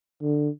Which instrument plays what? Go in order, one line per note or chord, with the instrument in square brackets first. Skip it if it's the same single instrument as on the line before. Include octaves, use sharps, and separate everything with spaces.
[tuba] D3